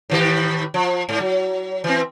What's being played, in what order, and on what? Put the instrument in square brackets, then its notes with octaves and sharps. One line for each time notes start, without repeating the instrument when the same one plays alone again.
[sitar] A2 D#3 G4
F3
G#2
F#3
E3 C4